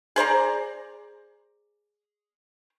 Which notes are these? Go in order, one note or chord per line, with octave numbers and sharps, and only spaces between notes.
G#4 C5 D5 A#5